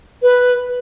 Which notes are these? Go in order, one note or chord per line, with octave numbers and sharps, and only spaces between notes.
B4